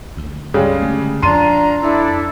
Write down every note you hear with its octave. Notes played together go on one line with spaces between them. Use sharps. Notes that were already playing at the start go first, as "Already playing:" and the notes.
D2
C#3 G3 G#3
D3 A3
F2 D4 F4 A#5 C6 D#7
D4 E4 A4